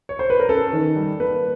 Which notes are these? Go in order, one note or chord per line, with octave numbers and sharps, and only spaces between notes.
C#5
C5
B4
A#4
C#4 A4
D#3
G3
A#3 B4